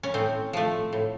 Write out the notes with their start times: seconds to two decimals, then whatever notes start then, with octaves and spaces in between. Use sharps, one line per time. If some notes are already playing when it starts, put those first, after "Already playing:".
0.03 C#4
0.14 A2 C4
0.53 F3 A3
0.93 A2